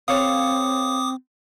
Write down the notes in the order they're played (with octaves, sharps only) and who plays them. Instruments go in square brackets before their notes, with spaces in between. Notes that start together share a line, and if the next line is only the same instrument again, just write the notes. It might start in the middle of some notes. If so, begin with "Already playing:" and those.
[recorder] C4 [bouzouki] A4 C#5 F5 [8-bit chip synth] D6 D#6